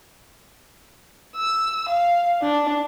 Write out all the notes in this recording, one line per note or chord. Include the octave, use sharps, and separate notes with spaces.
E6
F5
D4